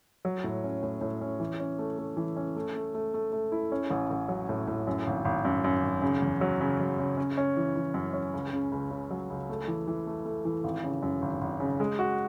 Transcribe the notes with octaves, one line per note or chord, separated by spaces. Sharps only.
F#3
A2
C#4
A2
A2
C#4
E3
C#4
A3
A3
E3
C#4
A3
A3
A3
A3
A3
E4
C#4
A1
A1
F#3
A2
A2
F#2
G#1
G#1
F#2
F#2
G#1
C#3
E2
F#3
C#3
F#3
C#3
C#4
C#4
E3
E3
F#2
C#4
C#2
C#3
C#2
C#3
F#3
C#2
A3
E3
E3
A3
A3
E3
G#1
C#3
F#2
G#1
G#1
C#3
G#3
F#4